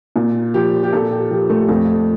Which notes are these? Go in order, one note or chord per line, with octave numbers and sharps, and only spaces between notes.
A#2
F3 G4
G4
A#2 A4
G4
F3 G4
A3
F2 A3